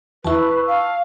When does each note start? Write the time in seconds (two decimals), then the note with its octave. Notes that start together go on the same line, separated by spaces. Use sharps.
0.24 E2 E4 B4 A5 C#6 E6
0.67 F5